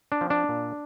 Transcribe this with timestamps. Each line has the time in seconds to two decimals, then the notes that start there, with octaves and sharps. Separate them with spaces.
0.12 D4
0.21 F3 C4
0.30 D4
0.49 A#2